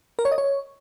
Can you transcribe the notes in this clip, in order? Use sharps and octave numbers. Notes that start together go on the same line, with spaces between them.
A#4
C#5
D#5
C#5